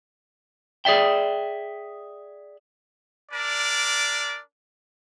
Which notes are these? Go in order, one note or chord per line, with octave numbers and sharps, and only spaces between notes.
G#4 D5 E5 G5
D4 A#4 D5